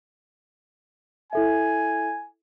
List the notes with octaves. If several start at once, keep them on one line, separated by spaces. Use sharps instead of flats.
E4 A4 E5 G#5